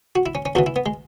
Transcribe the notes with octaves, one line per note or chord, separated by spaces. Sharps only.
F#4
E4
C#4
C#4
E2 C#3 E3 F#4
E4
B3
G#3